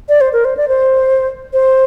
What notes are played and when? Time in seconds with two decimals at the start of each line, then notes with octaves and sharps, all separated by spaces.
0.09 D5
0.21 C5
0.33 A#4
0.45 C5
0.57 D5
0.68 C5
1.53 C5